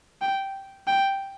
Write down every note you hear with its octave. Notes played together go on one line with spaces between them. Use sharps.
G5
G5